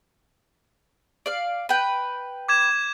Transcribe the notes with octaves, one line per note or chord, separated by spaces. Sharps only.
D5 F5
B4 G5
D6 G#6 E7